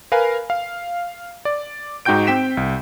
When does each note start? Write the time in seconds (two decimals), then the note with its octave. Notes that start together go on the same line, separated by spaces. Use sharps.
0.12 A#4 B4 F5 G#5
0.50 F5
1.45 D5
2.05 G#2 D#4 F#4 G5 G6 D7
2.27 C4 G5 B6 E7
2.57 C2